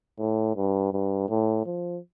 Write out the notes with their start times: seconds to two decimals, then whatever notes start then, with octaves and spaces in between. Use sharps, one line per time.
0.19 A2
0.56 G2
0.93 G2
1.29 A2
1.65 F3